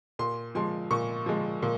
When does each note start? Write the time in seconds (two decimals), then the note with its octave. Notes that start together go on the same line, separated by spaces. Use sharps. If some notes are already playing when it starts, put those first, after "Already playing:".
0.19 A#2 C6
0.55 F3 G#3 C6
0.91 A#2 C#6
1.26 F3 G#3
1.62 A#2